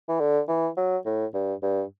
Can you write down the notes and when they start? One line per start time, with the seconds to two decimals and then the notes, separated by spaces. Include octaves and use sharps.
0.09 E3
0.20 D3
0.48 E3
0.77 F#3
1.05 A2
1.34 G2
1.63 G2